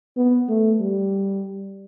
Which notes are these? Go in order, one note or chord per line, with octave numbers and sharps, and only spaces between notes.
B3
A3
G3